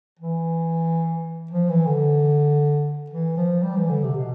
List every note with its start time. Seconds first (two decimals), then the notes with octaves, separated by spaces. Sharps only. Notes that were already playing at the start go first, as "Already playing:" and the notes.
0.19 E3
1.51 F3
1.69 E3
1.87 D3
3.10 E3
3.37 F3
3.63 G3
3.77 E3
3.89 D3
4.03 C3
4.16 B2